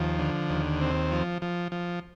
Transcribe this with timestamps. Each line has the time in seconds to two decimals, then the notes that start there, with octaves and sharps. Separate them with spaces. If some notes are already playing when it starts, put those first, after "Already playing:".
Already playing: D#2 F3
0.19 D3
0.49 D#2
0.81 C4
1.11 F3
1.42 F3
1.72 F3